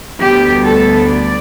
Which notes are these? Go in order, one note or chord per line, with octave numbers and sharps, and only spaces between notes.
D2 D3 G3 B3 G4
A4
D5